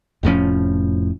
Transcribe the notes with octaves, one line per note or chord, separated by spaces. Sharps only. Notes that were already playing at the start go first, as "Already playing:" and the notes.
F1 A2 F3 C#4